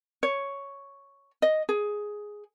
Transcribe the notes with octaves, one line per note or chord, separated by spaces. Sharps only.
C#5
D#5
G#4